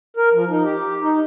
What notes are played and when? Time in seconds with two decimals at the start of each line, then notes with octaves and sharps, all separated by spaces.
0.17 A#4
0.34 F3
0.49 D#4
0.64 G4
1.02 D#4